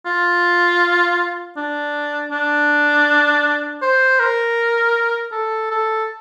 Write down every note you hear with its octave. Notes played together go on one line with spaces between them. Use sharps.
F4
D4
D4
C5
A#4
A4
A4